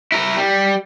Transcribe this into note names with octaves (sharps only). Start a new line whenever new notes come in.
E4 A#4
G3